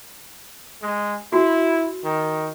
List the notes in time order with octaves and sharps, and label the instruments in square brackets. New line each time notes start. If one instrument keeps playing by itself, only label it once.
[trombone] G#3
[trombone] E4 [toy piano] F#4
[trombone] D#3